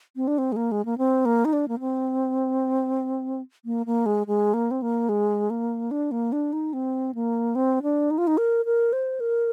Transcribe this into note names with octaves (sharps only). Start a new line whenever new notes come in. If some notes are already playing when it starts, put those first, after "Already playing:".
C4
D4
C4
G#3
A#3
G#3
A#3
C4
A#3
D#4
D4
A#3
C4
A#3
A#3
G#3
G#3
A#3
C4
A#3
G#3
A#3
D4
A#3
D4
D#4
C4
A#3
C4
D4
D#4
F4
D#4
A#4
A#4
C5
A#4